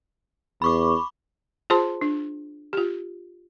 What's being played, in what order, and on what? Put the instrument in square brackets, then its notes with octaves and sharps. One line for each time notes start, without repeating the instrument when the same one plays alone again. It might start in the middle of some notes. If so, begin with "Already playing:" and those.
[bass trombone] E2 [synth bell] B5 C#6 D6
[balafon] F4 G#4 C5 A5 C6
D4
F4 G4